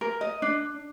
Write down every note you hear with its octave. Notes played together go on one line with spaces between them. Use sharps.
A#4
D#5
D4